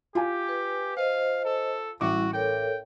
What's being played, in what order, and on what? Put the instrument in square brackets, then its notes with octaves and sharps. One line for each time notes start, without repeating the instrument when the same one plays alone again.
[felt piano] F4 G#5 [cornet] G4
[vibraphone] B4
[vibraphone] C5 D#5 [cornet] F5
[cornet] A4
[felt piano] A1 D6 [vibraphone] G3 E4 [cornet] F#4
[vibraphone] A4 A#4 C#5 [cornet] G5